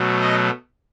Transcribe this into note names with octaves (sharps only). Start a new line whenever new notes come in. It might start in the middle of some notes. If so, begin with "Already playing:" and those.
Already playing: B2 F#3 A3
D#5